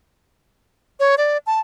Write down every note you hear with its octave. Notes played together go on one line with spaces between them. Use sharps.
C#5
D5
A5